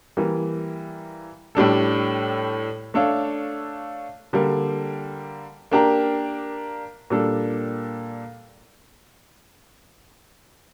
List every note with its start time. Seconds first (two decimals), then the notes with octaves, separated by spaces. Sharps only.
0.17 E3 G3 A#3
1.55 A2 G3 D4 A4
2.94 A3 D4 A4 C#5 F5
4.33 D3 G3 A#3
5.72 A#3 D4 G4 A#4
7.10 A#2 G3 D4 A4